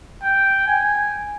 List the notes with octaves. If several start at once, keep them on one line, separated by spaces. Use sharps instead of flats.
G5
G#5